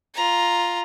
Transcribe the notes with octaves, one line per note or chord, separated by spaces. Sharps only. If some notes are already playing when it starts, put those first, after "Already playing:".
F4 A#5